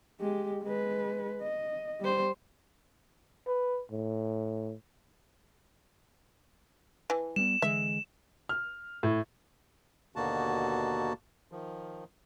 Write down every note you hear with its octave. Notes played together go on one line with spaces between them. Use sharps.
G#3 G4
G#3 B4
D#5
G3 C5
B4
A2
E3
G3 A3 B3 E7
D3 E3 G#3 E5
F6
A2
D#2 B2 D3 A#3 F#4 A5
D#3 F3